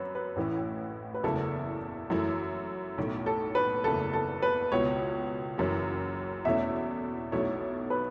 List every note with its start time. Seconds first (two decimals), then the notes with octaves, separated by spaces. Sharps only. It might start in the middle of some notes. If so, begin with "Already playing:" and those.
Already playing: F#2 B4 C#5
0.15 B4
0.36 A1 A2 E3 C#4 E4
1.14 B4
1.23 F#1 E2 C#3 A3 E4 A4
2.10 F#2 E3 A3 E4
2.98 B1 A2 A3
3.26 A4
3.55 B4
3.84 F#1 E2 C#3 A3 A4
4.13 A4
4.42 B4
4.72 C#2 B2 B3 E4 C#5
5.58 F#1 F#2 E3 C#4
6.45 E2 B2 A3 C#4 E4 E5
7.32 B1 B2 A3 E4 C#5
7.90 B4